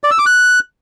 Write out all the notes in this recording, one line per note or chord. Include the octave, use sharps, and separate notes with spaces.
D5
E6
D6
F#6